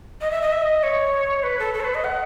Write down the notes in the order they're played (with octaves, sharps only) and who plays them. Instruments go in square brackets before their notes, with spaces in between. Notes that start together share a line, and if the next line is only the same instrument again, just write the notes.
[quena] D#5
E5
D#5
E5
D#5
C#5
B4
A4
A4
C#5
B4
D#5
F#5